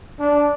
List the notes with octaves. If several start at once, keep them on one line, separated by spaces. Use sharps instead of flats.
D4